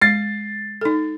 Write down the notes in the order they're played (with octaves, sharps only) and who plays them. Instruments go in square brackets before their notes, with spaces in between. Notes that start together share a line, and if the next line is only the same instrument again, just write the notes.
[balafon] G#3 [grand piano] A6 C7
[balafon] D#4 A4